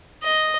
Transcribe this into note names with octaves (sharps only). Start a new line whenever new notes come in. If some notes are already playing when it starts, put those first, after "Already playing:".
D#5